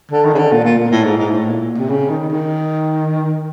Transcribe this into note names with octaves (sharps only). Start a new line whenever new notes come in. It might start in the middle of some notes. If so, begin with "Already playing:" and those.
D3
D#3
C#3
D3
A#2
A#2
A#2
A2
G#2
G#2
A2
A#2
C3
C#3
D#3
D#3